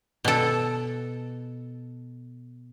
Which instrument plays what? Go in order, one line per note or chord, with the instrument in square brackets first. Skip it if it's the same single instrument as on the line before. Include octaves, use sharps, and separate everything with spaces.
[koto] B2 A4